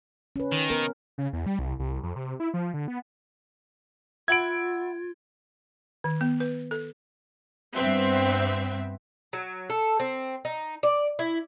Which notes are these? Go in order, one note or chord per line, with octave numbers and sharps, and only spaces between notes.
C#4 B4
D#3
B3 A#4
C#3
E2
G3
C2
C2
F2
C3
E4
F3
D3
B3
F4 E5 F#5 B5 G#6 D7
D#3
B3
B4
A4
G2 B3 C4 E5
F#3
A4
C4
D#4
D5
E4